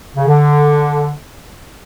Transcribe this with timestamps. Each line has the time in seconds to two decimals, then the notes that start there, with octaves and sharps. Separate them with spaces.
0.17 C#3
0.28 D3